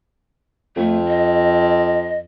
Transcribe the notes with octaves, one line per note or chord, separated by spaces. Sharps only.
F2 A3
D#5